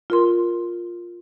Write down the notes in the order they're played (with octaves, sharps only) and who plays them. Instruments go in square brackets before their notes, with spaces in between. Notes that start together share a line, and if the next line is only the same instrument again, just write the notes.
[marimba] F4 A#4 C6